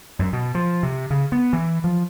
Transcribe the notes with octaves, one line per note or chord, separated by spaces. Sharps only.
F#2
B2
F3
C3
C#3
B3
E3
F3